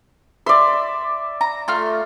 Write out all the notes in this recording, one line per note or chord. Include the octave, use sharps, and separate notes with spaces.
D5 E5 C6
A#5
A3 F4 F6